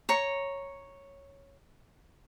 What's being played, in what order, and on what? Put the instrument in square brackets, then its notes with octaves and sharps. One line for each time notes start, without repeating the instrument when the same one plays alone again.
[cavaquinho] C#5 A#5